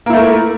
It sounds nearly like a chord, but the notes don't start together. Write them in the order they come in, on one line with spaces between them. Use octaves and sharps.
A#3 E4 A3 A#4